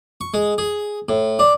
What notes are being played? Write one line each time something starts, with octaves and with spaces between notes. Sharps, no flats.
C#6
G#3
G#4
A2
D4